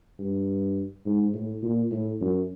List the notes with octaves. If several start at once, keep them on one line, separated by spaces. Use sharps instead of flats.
G2
G#2
A2
A#2
A2
F#2